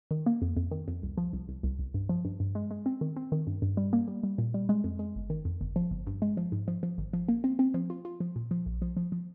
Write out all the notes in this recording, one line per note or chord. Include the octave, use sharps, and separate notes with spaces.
D#3
A#3
F2
F2
D#3
F2
C2
F3
C2
C2
C2
C2
G2
F3
G2
G2
G#3
G#3
C4
D#3
C4
D#3
G2
G2
G3
A#3
G3
G3
A#2
G3
G#3
F2
G#3
G1
D#3
F2
G1
F3
G1
G2
G#3
F3
G#2
F3
F3
G#1
F3
A#3
C4
C4
F3
F4
F4
F3
A#2
F3
A#1
F3
F3
F3